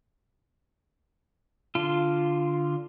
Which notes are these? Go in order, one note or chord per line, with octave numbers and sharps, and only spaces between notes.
D3 F4